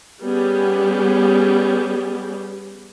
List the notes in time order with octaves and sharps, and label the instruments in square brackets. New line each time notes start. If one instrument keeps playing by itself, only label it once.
[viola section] G3 B3 C#4 G4 G#4